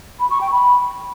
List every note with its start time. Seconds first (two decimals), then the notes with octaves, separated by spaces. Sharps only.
0.20 B5
0.30 C#6
0.41 G5
0.51 B5